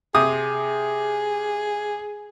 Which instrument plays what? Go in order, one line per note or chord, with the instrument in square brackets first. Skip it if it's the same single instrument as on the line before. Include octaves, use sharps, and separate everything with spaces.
[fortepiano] C3 D#6 [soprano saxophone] G#4